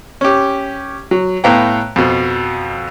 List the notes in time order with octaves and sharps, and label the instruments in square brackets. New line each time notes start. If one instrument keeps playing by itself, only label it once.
[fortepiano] C#4 G4
F#3
A2 B3 F5 G5 A#5
F2 B2